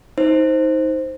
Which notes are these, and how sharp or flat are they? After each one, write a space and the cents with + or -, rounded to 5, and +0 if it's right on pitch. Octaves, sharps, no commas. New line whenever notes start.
D#4 +25 C5 +0